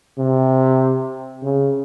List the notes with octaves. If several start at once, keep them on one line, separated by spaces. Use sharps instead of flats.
C3
C#3